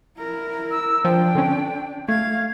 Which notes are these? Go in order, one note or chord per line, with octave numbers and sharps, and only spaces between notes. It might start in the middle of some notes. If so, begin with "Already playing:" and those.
E4 A#4
E6
F3 D4 G5
D3 C4 C#4
A3 F5 G#6